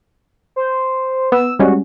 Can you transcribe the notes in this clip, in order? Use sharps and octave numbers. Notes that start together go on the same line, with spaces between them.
C5
B3 E6
G3 G#3 C#4 F#4